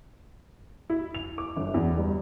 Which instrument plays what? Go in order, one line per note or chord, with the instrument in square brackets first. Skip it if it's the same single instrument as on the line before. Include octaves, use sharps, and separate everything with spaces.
[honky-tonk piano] E4
F7
D6
G1
E2
G3